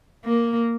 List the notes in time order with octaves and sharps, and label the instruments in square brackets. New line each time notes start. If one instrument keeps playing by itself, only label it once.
[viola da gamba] A#3